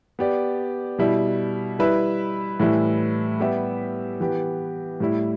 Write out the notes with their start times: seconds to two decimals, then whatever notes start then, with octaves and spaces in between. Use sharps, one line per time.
0.19 B3 G4 D5
0.98 B2 G3 E4
1.79 G3 E4 B4 E5
2.60 A2 E3 G3 E4 B4
3.40 G3 B3 G4 E5
4.20 E3 B3 G4
5.00 A2 G3 E4